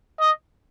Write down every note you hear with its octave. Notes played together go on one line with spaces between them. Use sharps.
D#5